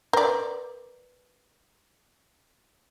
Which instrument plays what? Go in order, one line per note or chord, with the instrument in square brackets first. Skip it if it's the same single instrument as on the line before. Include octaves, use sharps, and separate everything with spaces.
[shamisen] A#4 D5 [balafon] B4